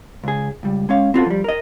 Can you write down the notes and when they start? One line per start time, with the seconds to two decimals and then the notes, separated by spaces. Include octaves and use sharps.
0.24 C#2 G#4
0.63 C#2 G3
0.89 G#3 C#4 F5
1.14 C4 F4 F#4 A4
1.26 F3 G3
1.44 A#4 D#5